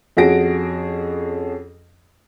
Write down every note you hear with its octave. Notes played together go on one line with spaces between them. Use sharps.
F2 C#4 F#4 G#4 A#6 D7